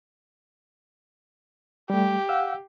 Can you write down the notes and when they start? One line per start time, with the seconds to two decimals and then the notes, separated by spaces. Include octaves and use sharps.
1.90 G3 A3 G4
2.29 F5 F#5 E6